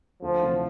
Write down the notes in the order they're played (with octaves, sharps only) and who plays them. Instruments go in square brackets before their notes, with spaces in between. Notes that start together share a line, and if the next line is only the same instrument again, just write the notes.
[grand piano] D2 [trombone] F3
[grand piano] C3 E3 A3 D4